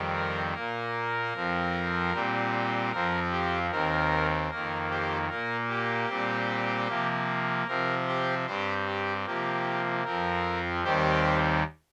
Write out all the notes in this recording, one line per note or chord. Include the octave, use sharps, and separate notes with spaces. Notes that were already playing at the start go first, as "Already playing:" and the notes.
Already playing: F2 D#3 G3 C4
A#4
A#2 A#3 A#4
F2 F3 C4
A#2 G3 C4
F2 F3 C4 A#4
G4
D#2 D#3 C4 A#4
F2 D#3 A#3 A#4
G4 C5
A#2 A#3 A#4
G4
A#2 G3 C4
C3 F3 A#3
C3 F3 C4 A#4
G4 C5
G2 G3 C4 G4 C5
G4
C3 F3 A#3 G4
F2 F3 C4 A#4
D#2 D#3 G3 C4 G4 C5